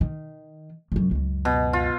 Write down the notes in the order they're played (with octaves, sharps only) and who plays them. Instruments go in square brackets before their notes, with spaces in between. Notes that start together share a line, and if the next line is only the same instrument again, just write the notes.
[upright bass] D#3
C#2 F#2
C#2 F#2
[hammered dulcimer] B2
F4